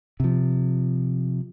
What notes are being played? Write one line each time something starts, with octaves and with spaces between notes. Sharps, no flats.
C3 F3